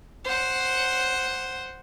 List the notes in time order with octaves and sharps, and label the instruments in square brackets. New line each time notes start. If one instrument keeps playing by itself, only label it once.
[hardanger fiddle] C5 F#5